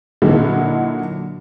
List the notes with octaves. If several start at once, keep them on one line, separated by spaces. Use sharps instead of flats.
A#2 D3 F#3 D#4 E4